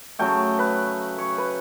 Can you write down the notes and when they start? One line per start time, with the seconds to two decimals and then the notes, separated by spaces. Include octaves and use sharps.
0.19 C#3 F#3 A3 G5
0.59 B4
1.18 C#5
1.38 B4